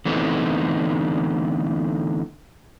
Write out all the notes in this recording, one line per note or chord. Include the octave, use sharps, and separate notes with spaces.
D3 E3 A3 B3 C4 D#4